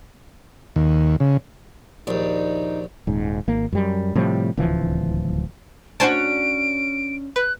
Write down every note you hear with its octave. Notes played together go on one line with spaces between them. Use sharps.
D#2
C#3
A#1 D#2 D4 D#4
D#1 G#2
G#1 A#3
F#2 G3
A2 C3 F3 G3
D1 C#2 E3 F3
C#4 D4 F#4 C5 G#5 A5 D7
B4 F#6